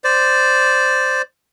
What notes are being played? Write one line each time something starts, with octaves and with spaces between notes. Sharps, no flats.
C5 D5